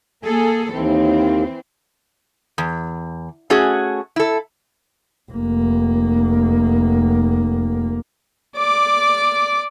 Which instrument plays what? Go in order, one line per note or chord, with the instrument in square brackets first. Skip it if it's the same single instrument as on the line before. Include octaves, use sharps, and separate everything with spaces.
[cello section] A#3 G#4 A4
[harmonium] D#2 [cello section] E3 C4
[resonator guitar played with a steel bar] E2
A3 C#4 F#4 G#4
E4 A4
[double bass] F1 A#3
[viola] D5 D6